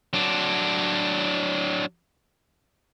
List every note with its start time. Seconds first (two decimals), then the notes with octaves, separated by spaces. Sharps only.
0.13 F#3 D4